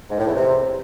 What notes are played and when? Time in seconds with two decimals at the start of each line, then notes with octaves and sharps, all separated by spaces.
0.10 G#2
0.18 A2
0.27 E2
0.35 C3